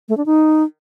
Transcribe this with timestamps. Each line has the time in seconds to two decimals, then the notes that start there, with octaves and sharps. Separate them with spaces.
0.09 A3
0.17 D4
0.26 D#4